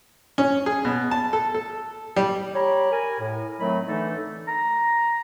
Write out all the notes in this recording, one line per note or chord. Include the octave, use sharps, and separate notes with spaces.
C#4
G#4
B2
A5
A4
A4
G3
G4 C#5 A#5 B5
A#4 G#5
A2
D#3 F#3 A3 C4 B5
D3 E3 A3 D#4 A4
A#5